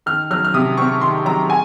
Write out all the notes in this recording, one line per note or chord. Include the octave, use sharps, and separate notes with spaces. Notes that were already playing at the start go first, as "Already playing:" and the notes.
D#3 F6
F#3 F6
F6
C3 D#6
C4 C#6
D#3 C6
F#3 A#5
G#5